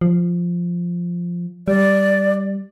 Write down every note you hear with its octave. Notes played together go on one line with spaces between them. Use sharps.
F3
G3 D5